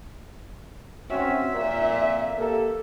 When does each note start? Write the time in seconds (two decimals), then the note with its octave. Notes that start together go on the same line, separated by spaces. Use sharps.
1.10 C4 C#4 F#4 E5
1.52 F2 A#2
2.37 A#3 G4 A4